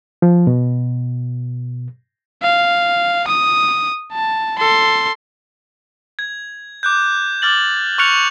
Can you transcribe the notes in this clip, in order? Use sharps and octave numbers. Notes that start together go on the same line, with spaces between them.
F3
B2
F5
D#6
A5
A4 C6
G#6
D6 F#6 G6
D6 F6 A6 F#7
C#6 F6 F#6 C#7 F7